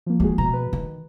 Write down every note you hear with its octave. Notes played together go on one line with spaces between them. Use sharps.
F3 A#3
D#2 G#3 F#4 G#4
B2 A#5
B4
D#3